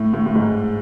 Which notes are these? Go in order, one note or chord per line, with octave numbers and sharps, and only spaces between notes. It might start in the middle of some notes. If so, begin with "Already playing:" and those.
Already playing: A2
A2
A2
G#2